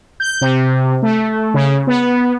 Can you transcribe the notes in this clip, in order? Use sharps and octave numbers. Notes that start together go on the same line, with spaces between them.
G6
C3
A3
C#3
B3